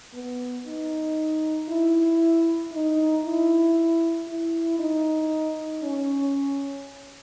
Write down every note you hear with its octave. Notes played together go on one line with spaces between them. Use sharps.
B3
D#4
E4
D#4
E4
E4
D#4
C#4